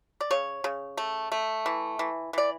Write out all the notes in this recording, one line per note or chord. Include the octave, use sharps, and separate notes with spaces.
D5
C#3 C#5
C#3
A3
A3
E3
E3
E3 D5